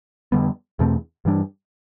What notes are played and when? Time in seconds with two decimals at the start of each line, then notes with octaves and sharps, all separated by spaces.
0.32 F2 D3 G3 B3
0.79 E2 B2 A3 C4
1.25 G2 E3 G3 D4